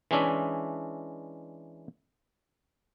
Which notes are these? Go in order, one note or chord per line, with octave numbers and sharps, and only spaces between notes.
E3 G#3 C#4 D4 E5